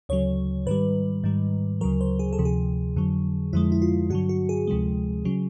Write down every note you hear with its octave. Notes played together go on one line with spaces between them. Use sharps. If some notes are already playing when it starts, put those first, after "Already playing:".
D2 C#3 F#3 C#5
G#2 D#3 G3 B4
G#2 D#3 G3
D2 C#3 F#3 A#4
C5
G#4
A4
D2 C3 F3
G#4
F2 D3 F#3
F2 D3 F3 G#3 E4
E4
F4
G2 D3 F#3 F#4
F#4
G#4
D2 C3 F3 G#3
C#3 F#3